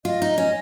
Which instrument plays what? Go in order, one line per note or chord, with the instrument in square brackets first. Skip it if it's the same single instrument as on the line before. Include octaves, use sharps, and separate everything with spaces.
[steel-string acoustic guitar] F4 [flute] D#5
[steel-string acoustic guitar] D#4
C#4